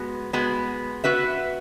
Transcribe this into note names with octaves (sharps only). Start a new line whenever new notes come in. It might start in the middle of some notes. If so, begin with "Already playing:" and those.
Already playing: G#3 B3 F#4
G#3 B3 F#4
B3 F#4 B4 E5